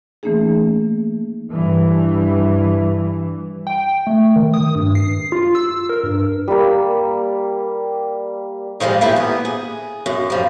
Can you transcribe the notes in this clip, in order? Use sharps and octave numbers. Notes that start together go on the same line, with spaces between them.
E3 A3 A#3 C#4 D#4 G#4
G2 E3
G5
A3
D#3
D#6
G2
C7
F4
E6
A#4
G2
G3 A#3
D#3 F3 G3 G#3 A#3
A#2 A#3 E4 G4 B4
B3
G#4
F#2
F3 G3